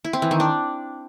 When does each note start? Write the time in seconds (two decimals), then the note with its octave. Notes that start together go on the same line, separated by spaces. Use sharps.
0.05 E4
0.13 C4
0.22 E3
0.31 D#3
0.40 D4